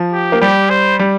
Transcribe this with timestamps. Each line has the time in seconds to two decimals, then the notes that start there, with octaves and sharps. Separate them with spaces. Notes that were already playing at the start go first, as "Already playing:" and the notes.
Already playing: F3
0.13 G4
0.32 A#3
0.41 G3 G4
0.70 C5
0.99 G3